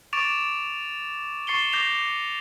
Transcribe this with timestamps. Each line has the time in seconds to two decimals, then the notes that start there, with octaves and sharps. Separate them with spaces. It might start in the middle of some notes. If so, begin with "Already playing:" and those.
0.13 C#6 D6 A6 D7 E7 F7
1.47 C#6 A6 C7 C#7 E7 G7
1.72 D6 G6 A#6 C7 F7